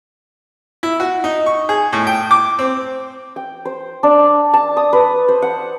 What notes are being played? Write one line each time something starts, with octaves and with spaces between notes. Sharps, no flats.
E4
F#4
D#4
C#6
G#4
A2
G5
D6
C4
G5
C5
D4
A5
D#6
B4
C5
F#5